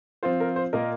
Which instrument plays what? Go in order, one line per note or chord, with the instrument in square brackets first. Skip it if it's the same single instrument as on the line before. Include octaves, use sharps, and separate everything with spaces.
[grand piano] F3 C4 F4 C5
A#4
C5
A#2 A#3 F4 A#4 D#5